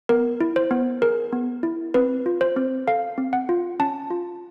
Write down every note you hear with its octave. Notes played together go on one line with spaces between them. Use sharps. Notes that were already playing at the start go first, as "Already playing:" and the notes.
B3 A#4
E4
C5
B3
G#4 A#4
B3
E4
C4 B4
F4
C5
C4
A4 F5
C4
F#5
F4
C#4 A5
F4